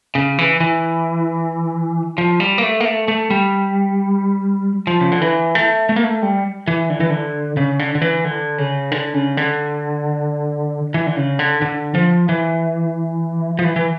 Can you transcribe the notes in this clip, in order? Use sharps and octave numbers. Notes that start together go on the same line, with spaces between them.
C#3
E3
E3
F3
G3
A#3
A3
A#3
A3
A3
G3
F3
C#3
D3
E3
A3
A3
A#3
A3
G3
E3
D3
E3
D3
C#3
D3
D3
E3
D3
C#3
D3
C#3
D3
E3
D3
C#3
D3
D3
F3
E3
F3
E3
E3